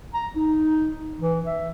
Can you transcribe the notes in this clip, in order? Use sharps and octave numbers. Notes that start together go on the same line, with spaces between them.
A#5
D#4
E3
E5